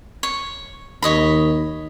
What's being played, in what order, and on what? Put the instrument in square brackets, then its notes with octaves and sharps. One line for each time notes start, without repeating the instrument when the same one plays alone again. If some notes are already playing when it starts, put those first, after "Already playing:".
[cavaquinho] C#5
[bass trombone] D#2 [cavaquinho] C#5 D#5 B5